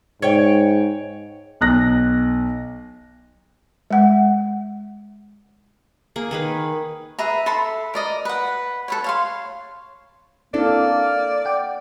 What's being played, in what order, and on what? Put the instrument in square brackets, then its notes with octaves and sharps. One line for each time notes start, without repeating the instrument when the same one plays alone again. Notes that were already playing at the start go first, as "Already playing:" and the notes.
[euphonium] G#2 [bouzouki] C#5 G5
[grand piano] B1 F#6 A#6
[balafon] G#3 F#5
[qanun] A#3 G#4
D#3 G#4 B4
[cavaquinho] G#4 B4 E5 A#5
A4 E5 B5 C6
A#4 D5 D#5
B4 F#5
A4 B4 C#5
C#5 F5 C6
[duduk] A#3 [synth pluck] C4 D4 E4 [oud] A4 [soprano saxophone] D5
[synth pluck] F#5 G5 D6